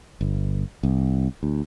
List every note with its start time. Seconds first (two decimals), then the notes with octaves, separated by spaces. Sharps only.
0.21 G1
0.83 C2
1.43 D2